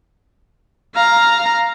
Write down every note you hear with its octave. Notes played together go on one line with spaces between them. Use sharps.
F5 A#5